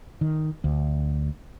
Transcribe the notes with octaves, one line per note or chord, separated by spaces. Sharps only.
D#3
D2